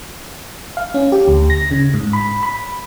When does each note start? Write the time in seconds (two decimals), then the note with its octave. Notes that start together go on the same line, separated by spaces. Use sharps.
0.77 F5
0.94 C#4
1.12 G4
1.28 D2
1.50 A#6
1.71 C#3
1.94 G#2
2.13 B5
2.43 B5